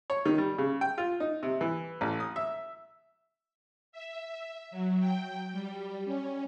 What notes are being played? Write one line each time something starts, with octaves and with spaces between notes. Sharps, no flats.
C#5
D#3
G3
C#3
G5
F4
D#4
C3
E3
A1
D#6
E5
E5
F#3
G5
G3
C#4